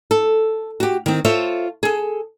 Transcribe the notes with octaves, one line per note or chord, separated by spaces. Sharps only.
A4
F#4 G4
D#3 C4
F4 A4 C5 C#5 E5
G#4 A4